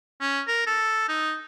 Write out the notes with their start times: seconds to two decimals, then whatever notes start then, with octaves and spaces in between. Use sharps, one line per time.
0.21 C#4
0.47 A#4
0.67 A4
1.09 D#4